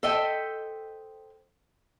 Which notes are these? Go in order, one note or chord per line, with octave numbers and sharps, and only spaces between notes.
A4 C5 D#5 E5 G5